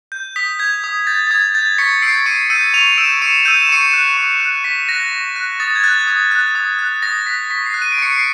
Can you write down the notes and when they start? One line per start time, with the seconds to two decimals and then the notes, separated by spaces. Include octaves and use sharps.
0.12 G6
0.36 D#6 B6
0.59 G6 G#6
0.84 D#6
1.07 G6 A6
1.27 A6
1.31 D#6 G#6
1.55 G6 A6
1.78 C#6 B6 C#7
2.02 E6 G6 C7 D7
2.26 C#6 C#7 D#7
2.50 E6 G6 C#7 D#7
2.74 C#6 D#7 F7
2.97 E6 G6 D7 E7
3.22 C#6 C#7 D#7
3.45 E6 G6 D#7
3.59 E7
3.69 C#6 C#7 D#7
3.93 F#6
4.17 C#6
4.41 F#6
4.64 C#6 B6
4.89 F#6 A#6
5.12 C#6
5.36 F#6
5.60 D#6 A6
5.75 G#6
5.84 F#6 A6
6.07 D#6
6.31 F#6
6.55 D#6
6.79 F#6
7.02 D#6 A#6
7.26 F#6 B6
7.50 C#6 B6
7.66 C7
7.74 F#6
7.82 D#7
7.92 D7
7.98 C#6 C#7
8.12 C7 D7